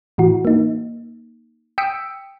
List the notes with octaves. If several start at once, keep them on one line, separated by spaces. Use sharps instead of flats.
A2 E3 F#4
A#3 D#4
G5 D#6 E6 B6 C#7 D7